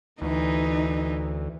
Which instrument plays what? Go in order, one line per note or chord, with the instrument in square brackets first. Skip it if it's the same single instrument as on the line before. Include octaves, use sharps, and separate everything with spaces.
[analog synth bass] D2 [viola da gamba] E3 [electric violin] D#4